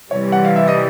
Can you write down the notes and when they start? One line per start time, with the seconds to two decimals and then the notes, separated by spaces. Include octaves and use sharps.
0.11 C3 E3 G3 C#5
0.32 F#5
0.45 F5
0.56 E5
0.68 D#5